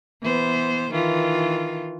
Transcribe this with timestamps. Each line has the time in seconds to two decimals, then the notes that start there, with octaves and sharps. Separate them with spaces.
0.22 E3 B3 C5
0.90 D#3 E3 F4